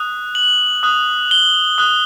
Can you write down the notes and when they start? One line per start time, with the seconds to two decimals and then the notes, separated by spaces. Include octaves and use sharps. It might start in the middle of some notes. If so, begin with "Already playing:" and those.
Already playing: D#6 F#6
0.35 F#7
0.83 D#6 F#6
1.31 G7
1.78 D#6 F#6